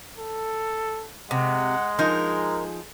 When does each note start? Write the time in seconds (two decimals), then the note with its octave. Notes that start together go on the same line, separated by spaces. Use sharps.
0.18 A4
1.31 C3 G#3 F#5
1.99 F3 D#4 G#4 A#4